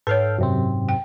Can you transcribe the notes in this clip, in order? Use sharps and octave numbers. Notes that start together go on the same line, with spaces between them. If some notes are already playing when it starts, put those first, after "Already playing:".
G#2 A4 B4 C#5 F5 G5
F#2 C3 C4
G5